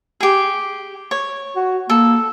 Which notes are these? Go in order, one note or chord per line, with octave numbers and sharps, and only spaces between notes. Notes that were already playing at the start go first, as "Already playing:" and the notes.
G4 G#4
C#5
F#4
A#3 A4